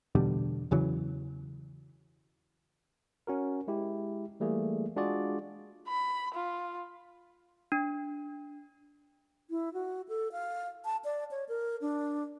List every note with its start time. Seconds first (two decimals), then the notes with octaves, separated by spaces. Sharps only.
0.15 E2 B2 D3 G3
0.71 E2 C#3 E3 F#3
3.27 C#4 F#4 A#4
3.68 G#3 E4 G4
4.40 E3 G3 A3 A#3 G#4
4.96 G#3 D4 F4 F#4 G#4 D5
5.88 B5
6.35 F4
7.72 D4
9.50 E4
9.74 F#4
10.09 A4
10.32 F5
10.85 A5
11.04 D5
11.31 C#5
11.49 A#4
11.82 D4